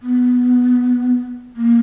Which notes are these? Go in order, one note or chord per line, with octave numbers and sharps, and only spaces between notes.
B3
A#3